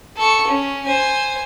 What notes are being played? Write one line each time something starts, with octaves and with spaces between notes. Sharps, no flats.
A4 C#6
C#4
C5 G#5